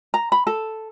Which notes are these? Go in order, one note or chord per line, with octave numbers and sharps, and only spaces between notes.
A#5
B5
A4